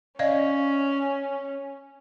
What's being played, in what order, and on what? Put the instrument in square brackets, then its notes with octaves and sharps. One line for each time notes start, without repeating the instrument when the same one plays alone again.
[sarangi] C#4 [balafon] D5 D#5 F5